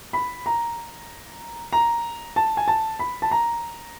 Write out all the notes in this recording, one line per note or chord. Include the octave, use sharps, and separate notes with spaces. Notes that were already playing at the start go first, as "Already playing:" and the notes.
B5
A#5
A#5
A5
G#5
A5
B5
A5
A#5